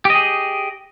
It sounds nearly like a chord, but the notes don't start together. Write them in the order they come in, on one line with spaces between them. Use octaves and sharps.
G4 D#5 G#4